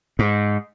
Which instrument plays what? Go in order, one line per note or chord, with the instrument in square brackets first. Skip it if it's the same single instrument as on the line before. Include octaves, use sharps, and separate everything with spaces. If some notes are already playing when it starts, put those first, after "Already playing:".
[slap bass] G#2